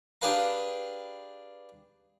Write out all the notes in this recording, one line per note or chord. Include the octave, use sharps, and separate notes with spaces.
D4 G4 G#4 B4 F5 A#5